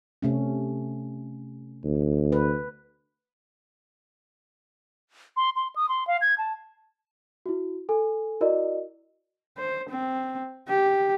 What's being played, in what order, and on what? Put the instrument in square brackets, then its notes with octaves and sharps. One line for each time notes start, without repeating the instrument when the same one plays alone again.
[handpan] C3 A3 C#4
[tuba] D2
[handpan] B4
[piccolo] C6
C6
D#6
C6
F5
G#6
A5
[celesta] E4 F#4
A4 G#5
E4 F#4 A#4 D5 D#5
[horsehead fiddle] C5
C4
G4